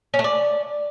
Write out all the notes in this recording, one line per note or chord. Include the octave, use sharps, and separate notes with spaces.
C#4
A3
D5